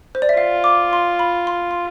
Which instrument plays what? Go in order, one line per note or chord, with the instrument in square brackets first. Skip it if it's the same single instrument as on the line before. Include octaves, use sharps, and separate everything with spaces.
[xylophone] C5
D5
E5
[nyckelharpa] F4 [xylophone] F5
[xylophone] D6
C6
B5
C6
C6